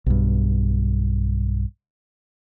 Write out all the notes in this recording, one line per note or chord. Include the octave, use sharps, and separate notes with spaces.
B1 G2